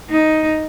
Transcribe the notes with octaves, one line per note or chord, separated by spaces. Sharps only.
D#4